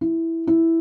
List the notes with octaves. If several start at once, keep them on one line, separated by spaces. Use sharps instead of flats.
E4
E4